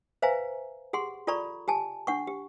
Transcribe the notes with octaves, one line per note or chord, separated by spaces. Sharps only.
B4 C5 E5 F5 G#5 A#5
G4 G#4 F#5 C6
F4 A4 D5 A#5 B5 C#6
G4 G#5 A5
D4 F#5 C#6
G4